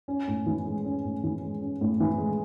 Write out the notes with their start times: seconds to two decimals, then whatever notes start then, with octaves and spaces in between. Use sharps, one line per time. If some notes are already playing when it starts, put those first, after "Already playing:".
0.08 C#4
0.28 A2
0.46 E3
0.65 G#3
0.85 C#4
1.04 A2
1.24 E3
1.42 G#3
1.61 C#4
1.81 A2
2.00 E3
2.18 G#3